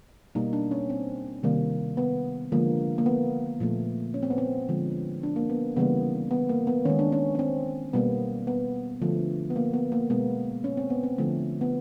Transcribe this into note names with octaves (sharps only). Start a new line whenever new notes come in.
B2 G3 A#3 D#4
D4
C#4
C4
C3 D#3 G3 A#3
B3
D3 F3 G#3 A#3
A#3
B3
A#2 F3 A3
C#4
C4
B3
C4
D3 F3 G#3
D4
A#3
B3
C#3 E3 G3 A#3 B3
B3
A#3
B3
D#3 G#3 C#4
D4
C#4
C#4
C4
B2 G3 A#3 B3
B3
D3 F3 A3
B3
A#3
B3
A#3
B2 G#3 B3
C#4
C4
B3
C4
D3 F3 A3
B3